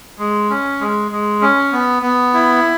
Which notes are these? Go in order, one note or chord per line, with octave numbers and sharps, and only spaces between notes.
G#3
C#4
G#3
G#3
C#4
B3
B3
E4